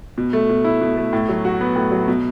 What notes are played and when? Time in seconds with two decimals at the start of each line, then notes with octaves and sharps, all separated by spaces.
0.18 B2
0.33 A3
0.49 B2
0.64 E4
0.81 B2
0.97 A3
1.13 A2
1.29 F#3
1.45 F#4
1.61 B3
1.76 A2
1.92 F#3
2.08 B2